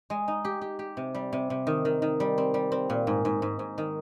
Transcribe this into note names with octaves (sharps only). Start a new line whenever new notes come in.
G#3
D#4
G4
G4
G4
C3
G3
C3
C3
D#3
D#3
D#3
G3
C4
G3
C4
A#2
G#2
G#2
G#2
G#2
D#3